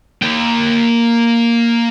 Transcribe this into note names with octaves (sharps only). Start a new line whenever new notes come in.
A#3 G5